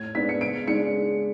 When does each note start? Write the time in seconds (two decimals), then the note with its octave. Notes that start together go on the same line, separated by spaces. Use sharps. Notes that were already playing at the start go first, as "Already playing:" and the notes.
Already playing: A2 G#6
0.15 G#3 B3 D4 B6
0.29 C#7
0.41 C#3 D7
0.67 G#3 D4 C#7